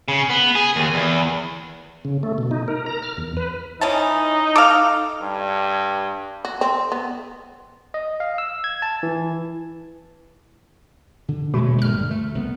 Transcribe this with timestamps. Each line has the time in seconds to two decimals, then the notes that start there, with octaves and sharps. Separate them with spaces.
0.08 C#3
0.30 B3
0.55 G#4
0.76 D#2
0.94 E2
2.05 C#3
2.23 A3
2.38 B2
2.51 D#4
2.68 A#4
2.86 A#5
3.02 F6
3.17 E2
3.37 B4
3.81 E3 C#4 D#4 A5
4.56 A4 F5 D6 E6 F6
5.22 G2
6.45 F#4
6.61 C4
6.92 B3
7.94 D#5
8.20 F5
8.38 E6
8.64 G#6
8.82 A5
9.03 E3
11.28 D3
11.54 D#1 B2 G#3 A3
11.82 A#1 G2 D3 F6
12.10 D2 A3
12.35 C2 B3